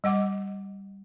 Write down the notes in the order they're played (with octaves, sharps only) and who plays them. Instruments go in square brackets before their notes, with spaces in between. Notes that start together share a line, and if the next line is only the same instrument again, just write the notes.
[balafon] G3 D#5 F#5 D6